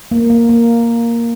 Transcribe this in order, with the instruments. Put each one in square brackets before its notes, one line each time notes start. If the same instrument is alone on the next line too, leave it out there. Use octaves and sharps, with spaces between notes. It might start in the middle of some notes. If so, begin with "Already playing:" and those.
[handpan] A#3
A#3
A#3